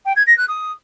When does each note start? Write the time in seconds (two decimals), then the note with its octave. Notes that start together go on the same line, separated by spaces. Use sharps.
0.05 G5
0.16 G#6
0.27 A#6
0.37 F#6
0.48 D#6